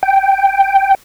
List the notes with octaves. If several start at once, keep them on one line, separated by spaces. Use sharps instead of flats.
G5